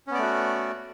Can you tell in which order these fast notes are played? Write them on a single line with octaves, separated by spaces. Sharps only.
C#4 B3 D5 A3 F#4